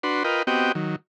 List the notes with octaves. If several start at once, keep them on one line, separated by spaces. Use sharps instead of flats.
D4 F#4 B4 C6
F4 A#4 B4 D#5 G5
B3 C4 F#4 G4 D#5 G5
D#3 F#3